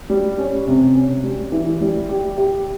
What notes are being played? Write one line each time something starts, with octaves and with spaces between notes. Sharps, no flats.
G3
C#4
C3
C#4
G3
E3
G3
G4
G4